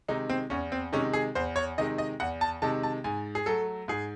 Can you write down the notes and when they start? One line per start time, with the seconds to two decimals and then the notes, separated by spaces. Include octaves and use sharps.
0.08 C3 D#3 G#3 D#4
0.30 C4
0.50 E2 C#4
0.72 C4
0.92 C3 D#3 G#3 C#4
1.13 G#4
1.35 E2 C5
1.56 C#5
1.78 C3 D#3 G#3 D#5
1.98 D#5
2.20 E2 F#5
2.41 A5
2.62 C3 D#3 G#3 A5
2.83 A5
3.04 G#2 G#5
3.35 G#4
3.46 F#3 A3 A4
3.88 G#2 G#4